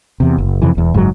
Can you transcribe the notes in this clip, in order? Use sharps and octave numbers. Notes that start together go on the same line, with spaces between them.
E2 C3
F#1
F2 C3 E3
E1 E2
F#1 G#2 C#3 F#3